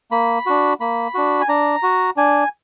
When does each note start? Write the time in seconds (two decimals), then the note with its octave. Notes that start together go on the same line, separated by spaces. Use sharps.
0.11 A#3 B5
0.46 D4 F#4
0.80 A#3 B5
1.14 D4 F#4
1.41 G#5
1.49 D4 A#5
1.83 F#4
2.17 D4 G#5